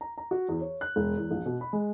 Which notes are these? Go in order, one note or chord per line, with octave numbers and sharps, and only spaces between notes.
A#5
A#5
F#4
E2
C#5
F#6
E1
E2
A#1
B2
B5
G#3